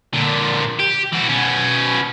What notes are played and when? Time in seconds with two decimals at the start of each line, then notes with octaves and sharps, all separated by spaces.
0.13 A#2 D3
0.79 G4
1.12 E3 F#4
1.28 B2 C#4